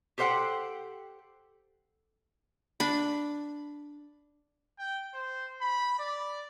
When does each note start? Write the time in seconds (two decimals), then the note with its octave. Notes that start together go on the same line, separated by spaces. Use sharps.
0.18 G4 A4 C5 E5 F#5 G5
2.80 D4 B5
4.79 G5
5.14 C5
5.62 B5
5.99 D5